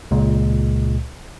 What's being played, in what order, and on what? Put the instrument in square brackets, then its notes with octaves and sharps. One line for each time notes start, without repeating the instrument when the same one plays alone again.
[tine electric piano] C#2 A#2 G#3